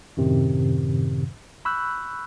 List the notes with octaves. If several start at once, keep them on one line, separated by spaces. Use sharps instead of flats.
F#2 A2 C3 D#3
B5 C#6 E6 F#6 G6